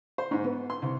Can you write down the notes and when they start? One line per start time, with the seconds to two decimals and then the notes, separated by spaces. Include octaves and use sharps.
0.18 C5
0.31 G#2
0.44 B3
0.70 C6
0.82 C2